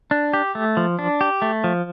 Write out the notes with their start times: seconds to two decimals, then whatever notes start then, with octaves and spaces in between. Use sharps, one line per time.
0.11 D4
0.33 G4
0.55 A3
0.77 F3
0.99 D4
1.21 G4
1.42 A3
1.64 F3